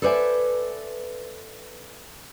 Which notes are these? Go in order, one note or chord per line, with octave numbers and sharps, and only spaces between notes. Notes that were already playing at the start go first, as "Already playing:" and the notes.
A4 B4 C5 D5 E5 G#5